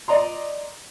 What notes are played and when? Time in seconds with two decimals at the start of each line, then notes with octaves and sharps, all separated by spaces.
0.08 D5 D#5 A#5 C6